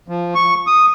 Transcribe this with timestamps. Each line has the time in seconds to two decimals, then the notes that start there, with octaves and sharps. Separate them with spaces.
0.08 F3
0.35 C#6
0.67 D#6